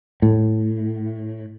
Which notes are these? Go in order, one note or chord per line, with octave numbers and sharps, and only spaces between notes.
A2